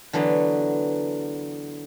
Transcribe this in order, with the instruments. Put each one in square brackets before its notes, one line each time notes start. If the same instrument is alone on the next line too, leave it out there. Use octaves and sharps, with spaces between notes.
[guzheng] D3 E3 F#3 B3